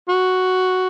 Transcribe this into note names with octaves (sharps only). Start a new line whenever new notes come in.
F#4